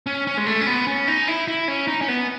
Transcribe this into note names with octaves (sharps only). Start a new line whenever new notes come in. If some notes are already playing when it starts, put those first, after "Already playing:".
C#4
C#4
G#3
A3
C#4
B3
C#4
D#4
E4
E4
C#4
D#4
C#4
B3